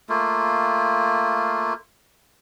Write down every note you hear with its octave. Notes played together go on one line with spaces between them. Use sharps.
A3 A#3 F4